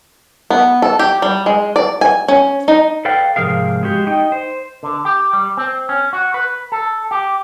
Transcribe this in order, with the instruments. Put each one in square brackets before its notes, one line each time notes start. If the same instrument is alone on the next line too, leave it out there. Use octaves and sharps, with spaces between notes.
[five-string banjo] B3
A4
G4
G3
G#3
D5
G#5
C#4
D#4
[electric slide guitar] A4 B4 D5 F5 G5
G#2 C3 F3 G#4 A#4 F5
G#3 F#4 G4
D#4 D#5 G5
C5
[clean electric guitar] D3
G4
G3
C4
C#4
F#4
B4
A4
G4